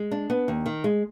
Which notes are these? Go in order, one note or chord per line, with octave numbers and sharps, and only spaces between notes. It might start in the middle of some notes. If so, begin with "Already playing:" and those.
Already playing: G#3
D4
B3
D#2
D#3
G#3